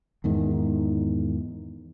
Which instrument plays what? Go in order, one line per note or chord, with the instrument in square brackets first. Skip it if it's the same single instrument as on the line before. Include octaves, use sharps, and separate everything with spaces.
[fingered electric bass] E2 G#2 D#3